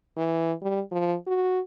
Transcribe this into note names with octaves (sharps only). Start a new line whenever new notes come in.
E3
G3
F3
F#4